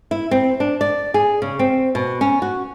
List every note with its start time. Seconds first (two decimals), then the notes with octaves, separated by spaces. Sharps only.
0.11 E4
0.31 C4
0.60 D4
0.81 D5
1.14 G#4
1.42 C#3
1.59 C4
1.95 B2
2.21 C#4
2.42 F#4